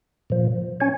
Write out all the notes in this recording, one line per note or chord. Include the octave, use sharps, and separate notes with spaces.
A#2 F3
C#4 C#5